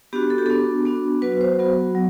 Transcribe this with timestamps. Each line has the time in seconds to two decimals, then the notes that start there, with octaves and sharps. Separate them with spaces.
0.13 B3 D4 F#4 G4
0.30 A4
0.38 G4
0.46 B3 D4 F#4 A4
0.85 B3 D4 F#4
1.22 F#3 B3 F#4 B4
1.41 C5
1.59 F#3 B3 F#4
1.95 F#3